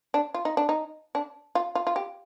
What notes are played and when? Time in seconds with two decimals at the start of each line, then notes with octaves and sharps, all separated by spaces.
0.14 D4
0.34 F4
0.45 D#4
0.57 D4
0.69 D#4
1.15 D4
1.55 F4
1.75 F4
1.87 F4
1.96 G4